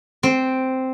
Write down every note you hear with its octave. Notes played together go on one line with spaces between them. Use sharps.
C4